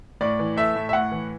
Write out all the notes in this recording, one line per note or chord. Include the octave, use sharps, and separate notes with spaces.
A2 D5
E3
A3 E5
A2
E5
A2 F#5
E3